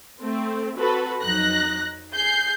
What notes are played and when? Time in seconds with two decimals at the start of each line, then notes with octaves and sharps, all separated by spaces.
0.21 A3 C4
0.78 C4 F#4 A4 B4
1.22 F2 F#3 D#4 F#6 A#6
2.13 G#4 G6 C7